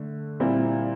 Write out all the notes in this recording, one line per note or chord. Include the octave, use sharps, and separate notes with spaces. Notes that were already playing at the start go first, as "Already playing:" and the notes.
Already playing: D3 A3
A#2 G3 C4 E4